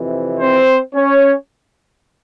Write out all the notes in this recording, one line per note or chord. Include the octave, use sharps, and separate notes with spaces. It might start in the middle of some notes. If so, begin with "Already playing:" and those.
Already playing: F2 C3 E3
C4 C5
C#4 C#5